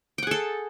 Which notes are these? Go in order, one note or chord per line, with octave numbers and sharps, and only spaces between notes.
G#4 A4 F#5 G5